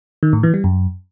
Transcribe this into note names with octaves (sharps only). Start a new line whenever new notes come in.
D#3
A2
E3
G3
F#2